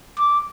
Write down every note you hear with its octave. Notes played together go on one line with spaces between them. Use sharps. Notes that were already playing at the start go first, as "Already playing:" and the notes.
D6